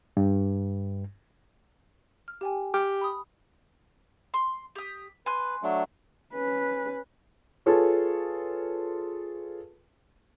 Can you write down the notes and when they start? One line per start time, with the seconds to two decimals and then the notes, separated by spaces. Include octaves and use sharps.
0.17 G2
2.28 F6
2.41 G4 G5 G#5
2.74 G4 F6
3.01 B5 D#6
4.34 C6
4.75 G4 D#6
5.26 B4 G#5 C6 F#6
5.63 F#3 A3 D4
6.34 C#4 B4
7.66 F4 G#4 A4 B4 C#5